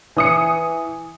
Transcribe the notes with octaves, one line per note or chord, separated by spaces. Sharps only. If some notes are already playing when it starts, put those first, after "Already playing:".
E3 D#6 C#7